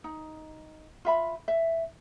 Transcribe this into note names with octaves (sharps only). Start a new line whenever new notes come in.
D#4
F4 E5 B5
E5